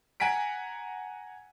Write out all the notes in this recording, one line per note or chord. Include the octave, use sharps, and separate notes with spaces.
F#5 G#5 A#5 B6 D7